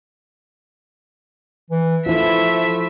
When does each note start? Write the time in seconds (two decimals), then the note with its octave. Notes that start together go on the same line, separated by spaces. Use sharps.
1.70 E3
2.06 F3 A3 E4 F4 E5